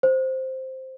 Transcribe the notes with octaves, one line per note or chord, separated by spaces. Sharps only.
C5